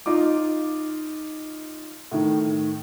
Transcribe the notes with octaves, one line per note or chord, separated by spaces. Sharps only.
D#4 F4 D6
A2 D#3